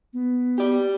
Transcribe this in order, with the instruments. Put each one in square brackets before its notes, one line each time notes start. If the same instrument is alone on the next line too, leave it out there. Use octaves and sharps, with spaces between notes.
[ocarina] B3
[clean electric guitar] G4 D5